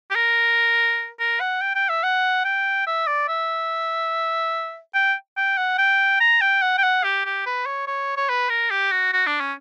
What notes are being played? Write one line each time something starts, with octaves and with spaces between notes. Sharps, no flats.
G4
A#4
A#4
F#5
G5
G5
E5
F#5
G5
E5
D5
E5
G5
G5
F#5
G5
A#5
G5
F#5
G5
F#5
G4
G4
B4
C#5
C#5
C#5
B4
A#4
G4
F#4
F#4
D4
C#4